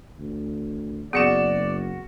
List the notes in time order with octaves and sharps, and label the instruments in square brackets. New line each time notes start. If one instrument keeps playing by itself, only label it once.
[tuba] D2
[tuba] F#1 [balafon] B3 G#4 [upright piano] F#4 C#7 E7 [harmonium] D5